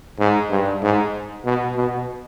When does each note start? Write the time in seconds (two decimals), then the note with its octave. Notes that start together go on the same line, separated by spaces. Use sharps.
0.19 G#2
0.51 G2
0.82 G#2
1.45 B2
1.76 B2